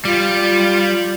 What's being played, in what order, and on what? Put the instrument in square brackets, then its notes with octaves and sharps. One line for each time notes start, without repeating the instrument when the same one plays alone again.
[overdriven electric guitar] G3 [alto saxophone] F4